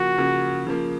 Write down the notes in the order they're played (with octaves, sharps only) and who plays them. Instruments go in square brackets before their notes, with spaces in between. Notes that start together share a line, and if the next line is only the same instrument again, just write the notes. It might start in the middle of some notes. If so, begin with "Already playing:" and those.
Already playing: [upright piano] C#3 F3 A#3 [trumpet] F#4
[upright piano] C#3 F3 A#3
C#3 F3 A#3